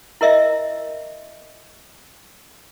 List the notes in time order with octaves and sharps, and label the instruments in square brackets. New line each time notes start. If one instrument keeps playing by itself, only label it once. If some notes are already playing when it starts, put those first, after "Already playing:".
[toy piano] E4 A#4 D#5 E5